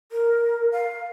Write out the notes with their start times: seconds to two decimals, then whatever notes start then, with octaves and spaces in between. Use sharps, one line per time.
0.12 A#4
0.72 F5